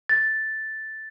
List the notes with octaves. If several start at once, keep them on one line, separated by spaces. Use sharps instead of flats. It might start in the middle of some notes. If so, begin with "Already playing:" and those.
A6